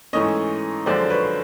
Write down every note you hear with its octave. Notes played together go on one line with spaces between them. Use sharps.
G#2 E3 A3 C#4 C#5 D#5
F#2 D3 F3 G#3 C5 D5
B4 C#5